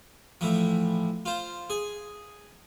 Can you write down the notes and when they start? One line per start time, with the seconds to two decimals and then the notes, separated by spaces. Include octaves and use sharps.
0.41 A2 E3 F3
1.26 F4 C5
1.70 G#4